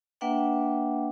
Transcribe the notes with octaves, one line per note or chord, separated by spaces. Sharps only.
A#3 D4 B4 E5 F#5 G5